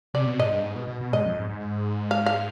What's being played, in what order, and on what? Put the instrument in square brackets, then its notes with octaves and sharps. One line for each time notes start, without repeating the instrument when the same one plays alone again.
[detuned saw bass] C3 [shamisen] D5
[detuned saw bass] B2
[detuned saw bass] G#2 [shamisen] D#5
[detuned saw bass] G2
G#2
B2
B2
B2
[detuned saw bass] G#2 [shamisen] D#5
[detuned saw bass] F2
G#2
G#2
[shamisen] F5
F5